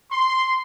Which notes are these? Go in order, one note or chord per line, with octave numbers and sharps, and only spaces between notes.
C6